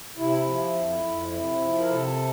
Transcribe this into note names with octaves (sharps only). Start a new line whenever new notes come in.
C3 E4
F3
F2
F2
C3
F3
A#4
C3 A4